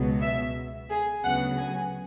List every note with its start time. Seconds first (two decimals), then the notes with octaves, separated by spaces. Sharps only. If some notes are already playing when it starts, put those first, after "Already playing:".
Already playing: C#2 B2 F#3 B3
0.22 E5
0.90 G#4
1.24 D2 C#3 F#3 B3 F#5
1.58 G#5